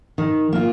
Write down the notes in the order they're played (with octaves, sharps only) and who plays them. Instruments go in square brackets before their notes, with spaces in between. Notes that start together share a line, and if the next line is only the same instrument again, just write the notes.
[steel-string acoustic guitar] D#3
A#3 F4